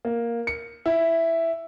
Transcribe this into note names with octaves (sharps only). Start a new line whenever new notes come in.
A#3
C#7
E4